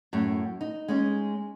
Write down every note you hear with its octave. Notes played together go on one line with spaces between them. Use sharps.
F#2 A2
D#4
G#3 C#4 D#4